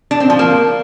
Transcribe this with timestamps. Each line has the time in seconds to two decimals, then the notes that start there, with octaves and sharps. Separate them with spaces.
0.11 D4
0.20 C4
0.30 F3
0.39 A#3